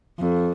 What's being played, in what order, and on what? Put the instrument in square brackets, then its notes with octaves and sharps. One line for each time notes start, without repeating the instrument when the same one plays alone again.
[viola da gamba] F2